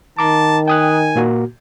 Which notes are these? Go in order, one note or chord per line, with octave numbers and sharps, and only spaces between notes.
D#3 A5 A#5 D6
G5 G#5 D#6 F#6
A#2 A#3 F#4